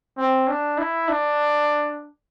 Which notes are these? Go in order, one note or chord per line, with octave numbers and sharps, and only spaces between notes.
C4
D4
E4
D4